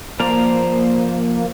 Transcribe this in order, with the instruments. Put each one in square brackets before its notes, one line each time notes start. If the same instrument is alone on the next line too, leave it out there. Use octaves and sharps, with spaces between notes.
[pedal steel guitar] F3 D5 A#5 [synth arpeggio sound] A#3 [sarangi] C5